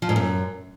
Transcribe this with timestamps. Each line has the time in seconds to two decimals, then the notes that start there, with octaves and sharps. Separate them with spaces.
0.02 F3
0.09 G#2
0.16 F#2